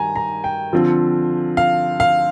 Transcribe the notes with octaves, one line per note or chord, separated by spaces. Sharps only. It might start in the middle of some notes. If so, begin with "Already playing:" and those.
Already playing: D#3 G3 G#5 A#5
A#5
G5
D3 F3 C4 F4
F5
F5